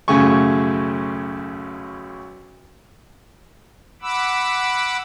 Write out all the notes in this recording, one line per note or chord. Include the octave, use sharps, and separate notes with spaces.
B1 F#2 C#3 A3 G#5 C#6
F#5 B5 D6 E6